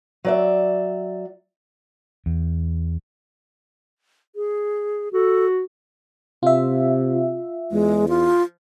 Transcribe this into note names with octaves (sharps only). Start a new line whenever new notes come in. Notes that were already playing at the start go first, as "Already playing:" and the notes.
F#3 D5 E5
E2
G#4
F#4 A4
C3 F4 E5
E2 G#3
F4